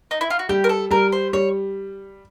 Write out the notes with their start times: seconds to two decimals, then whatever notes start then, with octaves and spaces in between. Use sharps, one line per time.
0.11 D#4
0.21 E4
0.30 F4
0.39 F#4
0.49 G3 G4
0.64 A#4
0.69 A4
0.91 G3 A#4
1.12 C5
1.33 G3 C#5